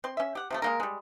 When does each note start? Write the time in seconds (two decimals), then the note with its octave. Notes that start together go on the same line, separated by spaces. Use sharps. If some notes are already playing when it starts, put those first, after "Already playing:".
0.04 C4 C6
0.17 C#4 E5
0.35 G4 F#5
0.51 C3 F3 A3
0.62 G#3 A#3 A#4
0.80 G3 G#3